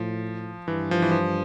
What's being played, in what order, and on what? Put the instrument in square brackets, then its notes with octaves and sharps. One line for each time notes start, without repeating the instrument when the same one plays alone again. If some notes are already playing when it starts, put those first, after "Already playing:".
Already playing: [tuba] A2 [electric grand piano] F3
[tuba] G2 [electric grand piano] E3
[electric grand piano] F3
E3
F3